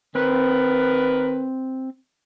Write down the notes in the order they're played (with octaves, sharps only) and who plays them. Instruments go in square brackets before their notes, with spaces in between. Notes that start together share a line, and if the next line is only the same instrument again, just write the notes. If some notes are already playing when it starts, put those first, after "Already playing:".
[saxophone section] D#3 A#4 B4 [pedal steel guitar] C4